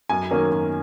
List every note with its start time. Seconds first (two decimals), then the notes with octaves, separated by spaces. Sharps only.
0.09 F#2 G#5
0.31 D#3 F#3 A#3 C#4
0.52 F#2